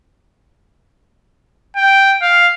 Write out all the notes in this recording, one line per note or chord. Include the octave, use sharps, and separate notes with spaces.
G5
F5